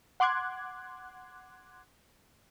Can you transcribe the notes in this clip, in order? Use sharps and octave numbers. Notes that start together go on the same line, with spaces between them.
F#5 C6 D6 F#6 G#6